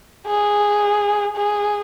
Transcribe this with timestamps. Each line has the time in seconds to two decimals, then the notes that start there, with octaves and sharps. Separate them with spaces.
0.27 G#4
1.36 G#4